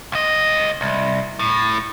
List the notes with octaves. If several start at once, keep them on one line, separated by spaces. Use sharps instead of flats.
C#2 D#5
C2
A2